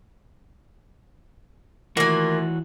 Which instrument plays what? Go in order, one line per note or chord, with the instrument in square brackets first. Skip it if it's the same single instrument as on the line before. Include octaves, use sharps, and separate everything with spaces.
[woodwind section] D#3 A3 F4 [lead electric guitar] E3 F#4 [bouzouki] A#3 G#5